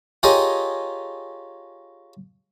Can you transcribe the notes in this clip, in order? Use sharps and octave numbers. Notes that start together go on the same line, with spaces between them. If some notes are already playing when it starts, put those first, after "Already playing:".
F4 G4 G#4 A#4 C#5 D#5